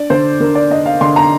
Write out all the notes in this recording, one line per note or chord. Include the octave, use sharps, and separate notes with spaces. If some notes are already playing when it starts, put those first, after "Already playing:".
Already playing: D4 D5
D3 C5
D3 A#4
D5
D4 D#5
F5
D3 C6
A#5